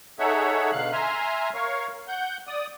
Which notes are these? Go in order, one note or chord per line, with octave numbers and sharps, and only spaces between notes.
D#4 G#4 A4 C#5 E5 F#5
B2 D3 F5 F#6
E5 G#5 A#5 C6 F6
A#4 C#5 F5 C#6
F#5 G6
D5 D#6